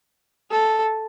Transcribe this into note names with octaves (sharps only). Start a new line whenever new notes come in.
A4